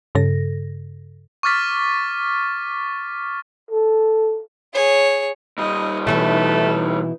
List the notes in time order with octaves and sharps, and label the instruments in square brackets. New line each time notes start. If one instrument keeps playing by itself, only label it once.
[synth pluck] G2 C#3 A4 A#6
[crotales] C#6 D6 F6 A6 B6
[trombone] A4
[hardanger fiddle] G#4 C#5
[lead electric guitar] A#2 G3 [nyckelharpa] D#5
[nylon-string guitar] B2 E3 C#4 [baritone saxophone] A3 [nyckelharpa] D#4 B4